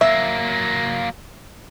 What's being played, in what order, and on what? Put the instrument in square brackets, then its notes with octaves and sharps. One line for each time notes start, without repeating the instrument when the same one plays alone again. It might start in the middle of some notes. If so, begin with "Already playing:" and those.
[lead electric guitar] F#3 A#3 [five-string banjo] E5